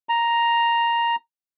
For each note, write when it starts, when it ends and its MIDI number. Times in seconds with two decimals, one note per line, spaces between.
0.09 1.16 82